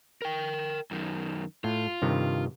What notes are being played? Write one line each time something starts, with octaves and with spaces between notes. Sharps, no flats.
A#4 G5
F#2 D#3
A2 F4
G2 C3 D#3